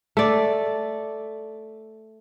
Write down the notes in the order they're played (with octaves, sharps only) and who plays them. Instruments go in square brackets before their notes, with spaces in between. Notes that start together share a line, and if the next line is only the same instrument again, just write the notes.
[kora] A3 D5